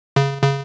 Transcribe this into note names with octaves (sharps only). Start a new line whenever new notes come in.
C#3
C#3